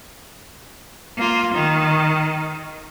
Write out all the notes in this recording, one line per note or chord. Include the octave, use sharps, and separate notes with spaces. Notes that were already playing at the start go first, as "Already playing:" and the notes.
A#3 F4
D#3